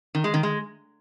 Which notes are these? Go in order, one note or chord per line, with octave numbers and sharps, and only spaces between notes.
D#3
G#3
D#3
G#3